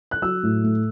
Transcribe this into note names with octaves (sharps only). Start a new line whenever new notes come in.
F#6
F#3 E6
A2
A3